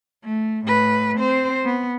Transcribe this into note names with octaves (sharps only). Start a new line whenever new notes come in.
A3
A2 B4
C4 C5
B3